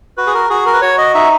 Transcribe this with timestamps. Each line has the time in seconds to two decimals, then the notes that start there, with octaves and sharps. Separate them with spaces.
0.17 F#4 B4
0.26 G#4
0.34 A#4
0.50 F#4 G#4
0.66 A#4
0.74 B4
0.81 F#4 C#5
0.98 D#5
1.14 D#4 E5